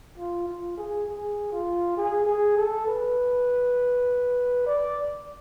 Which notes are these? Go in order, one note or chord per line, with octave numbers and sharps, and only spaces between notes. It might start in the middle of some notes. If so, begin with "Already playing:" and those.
F4
F4
G#4
G#4
F4
G#4
G#4
A4
B4
D5